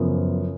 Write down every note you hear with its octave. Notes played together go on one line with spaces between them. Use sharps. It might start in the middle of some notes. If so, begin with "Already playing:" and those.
Already playing: F#2 C#3 F3 B3